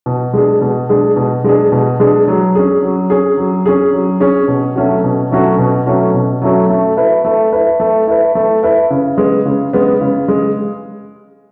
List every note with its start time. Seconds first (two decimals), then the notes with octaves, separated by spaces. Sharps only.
0.06 B2
0.33 G#3 D4 G#4
0.61 B2
0.89 G#3 D4 G#4
1.16 B2
1.44 G#3 D4 G#4
1.72 B2
2.00 G#3 D4 G#4
2.28 F#3
2.55 C#4 G#4
2.83 F#3
3.10 C#4 G#4
3.37 F#3
3.66 C#4 G#4
3.93 F#3
4.20 C#4 G#4
4.48 B2
4.76 F#3 A3 C#4 F#4
5.04 B2
5.31 F#3 A3 C#4 F#4
5.58 B2
5.86 F#3 A3 C#4 F#4
6.14 B2
6.42 F#3 A3 C#4 F#4
6.69 A3
6.97 E4 B4
7.25 A3
7.52 E4 B4
7.80 A3
8.07 E4 B4
8.35 A3
8.63 E4 B4
8.90 C#3
9.18 G#3 B3
9.45 C#3
9.73 G#3 B3
10.01 C#3
10.28 G#3